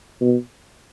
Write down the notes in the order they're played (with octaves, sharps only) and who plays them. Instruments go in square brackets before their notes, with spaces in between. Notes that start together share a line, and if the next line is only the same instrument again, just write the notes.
[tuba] B2